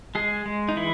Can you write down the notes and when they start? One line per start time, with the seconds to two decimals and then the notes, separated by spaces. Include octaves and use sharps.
0.15 G#3 G#4
0.46 G#3
0.69 D#4
0.76 E3 E4